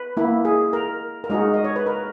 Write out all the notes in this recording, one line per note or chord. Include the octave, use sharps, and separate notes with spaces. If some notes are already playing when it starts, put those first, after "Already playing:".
Already playing: B4
A#3 E4
G#4
A#4
A#4
G#3 D#4 F#4 G#4
D#5
C#5
B4
A#4